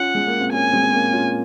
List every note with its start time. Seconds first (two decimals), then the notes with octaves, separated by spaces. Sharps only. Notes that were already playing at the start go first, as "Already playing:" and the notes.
Already playing: C#4 F4 F#5
0.15 G#3
0.27 A#3
0.41 C4
0.53 A#3 C#4 G#5
0.73 G#3 C4
0.83 C4
0.93 A#3 C#4
1.12 C#4 F4